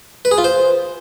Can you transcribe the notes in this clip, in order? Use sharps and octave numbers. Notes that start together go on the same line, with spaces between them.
B4
G#4
F4
C5